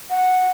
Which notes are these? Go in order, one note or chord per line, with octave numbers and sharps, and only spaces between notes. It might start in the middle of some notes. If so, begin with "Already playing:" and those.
F#5